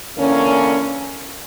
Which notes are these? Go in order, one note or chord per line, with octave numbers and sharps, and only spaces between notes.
E2 D3 A#3 C#4